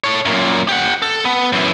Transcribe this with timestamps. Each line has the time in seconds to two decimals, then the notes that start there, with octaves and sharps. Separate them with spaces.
0.04 A4 C#5
0.25 F#2 A#2
0.69 G4 F#5
1.02 A4
1.25 B3
1.52 F#2 E3